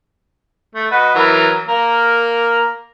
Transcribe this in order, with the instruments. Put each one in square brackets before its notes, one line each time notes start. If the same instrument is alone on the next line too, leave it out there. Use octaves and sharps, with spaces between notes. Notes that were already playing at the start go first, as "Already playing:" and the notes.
[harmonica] A3
F#4 B4 D#5
E3 F#3 A#4
A#3 A#4